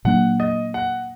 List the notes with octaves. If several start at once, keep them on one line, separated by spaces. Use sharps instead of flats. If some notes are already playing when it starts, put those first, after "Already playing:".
A#2 F#3 A#3 D4 F#5
D#5
F#5